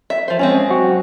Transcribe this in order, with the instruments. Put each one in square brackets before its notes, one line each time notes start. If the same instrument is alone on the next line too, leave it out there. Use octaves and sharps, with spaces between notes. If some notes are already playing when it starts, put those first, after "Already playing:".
[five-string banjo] E5
F3 C5
[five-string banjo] F3 G#3 C4 [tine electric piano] C#4
[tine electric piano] F#3 F#4